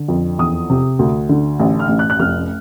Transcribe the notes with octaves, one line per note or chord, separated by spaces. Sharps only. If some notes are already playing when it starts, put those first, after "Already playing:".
Already playing: D3
F2
E2 D#6
C3
D2
D3
A1
F6
A1
F#6
F#6
F1 F6